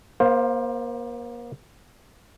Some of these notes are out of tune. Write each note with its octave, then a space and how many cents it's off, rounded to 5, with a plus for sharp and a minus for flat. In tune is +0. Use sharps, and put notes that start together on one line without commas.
A#3 +35 C5 +15 F5 +0